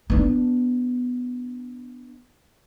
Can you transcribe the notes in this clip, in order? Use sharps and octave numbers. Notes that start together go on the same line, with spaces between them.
B3 D4